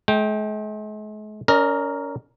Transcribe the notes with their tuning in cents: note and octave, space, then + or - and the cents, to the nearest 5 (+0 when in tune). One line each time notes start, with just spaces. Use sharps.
G#3 +45 G5 +0
C#4 +30 A#4 +0 D#5 -30